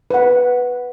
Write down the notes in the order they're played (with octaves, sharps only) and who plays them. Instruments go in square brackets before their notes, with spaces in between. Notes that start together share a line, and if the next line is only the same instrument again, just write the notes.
[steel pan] B4 F#5